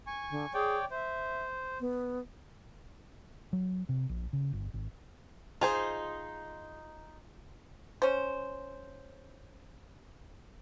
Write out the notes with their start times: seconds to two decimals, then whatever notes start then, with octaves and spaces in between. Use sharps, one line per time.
0.07 G#5 C#6
0.31 D3
0.54 G#4 C#5 D5 G5
0.91 C5 E5
1.80 B3
3.53 F#3
3.89 C3
4.09 A#1
4.33 C#3
4.53 G1
4.74 G#1
5.61 D#4 F4 G#4 C5
8.02 C#4 C5